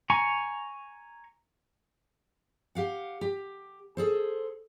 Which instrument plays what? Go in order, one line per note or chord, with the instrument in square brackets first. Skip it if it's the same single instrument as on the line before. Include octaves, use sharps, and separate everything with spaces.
[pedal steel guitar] G#5 A#5 C#6
[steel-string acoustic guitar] G4 F5 F#5
G4
G#4 A4 C5